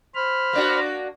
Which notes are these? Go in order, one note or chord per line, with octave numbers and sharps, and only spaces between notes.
C5 B5 F6
A#3 D4 F#4